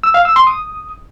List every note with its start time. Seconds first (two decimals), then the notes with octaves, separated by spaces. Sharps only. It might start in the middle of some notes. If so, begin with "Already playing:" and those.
0.03 E6
0.14 F5
0.25 E6
0.36 C6
0.47 D#6